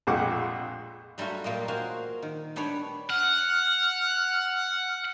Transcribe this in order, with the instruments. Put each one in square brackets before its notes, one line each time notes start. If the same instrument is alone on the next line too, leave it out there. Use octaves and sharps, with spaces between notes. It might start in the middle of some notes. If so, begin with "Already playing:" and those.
[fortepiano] A#1 F2 G#3 F#5 C#6 D6
[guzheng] F#3 G3 A3 F4 F#4
A#2 A#3 G4 D#5
F#4 G#4 C5 F5
D#3
G3 B3 D4 B4 C#5
[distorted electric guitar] F#5 [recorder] F6